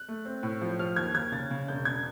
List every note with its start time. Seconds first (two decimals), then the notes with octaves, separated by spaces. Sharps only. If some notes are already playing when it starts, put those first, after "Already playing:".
Already playing: F#6
0.08 A3
0.25 C4
0.43 A2
0.61 F3
0.79 F3 F6
0.96 D#2 G#6
1.15 D#2 G#6
1.32 C#3 A6
1.51 C#3
1.68 E1 G6
1.85 E1 G#6